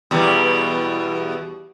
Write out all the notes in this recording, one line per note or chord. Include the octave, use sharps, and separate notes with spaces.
E2 B2 G3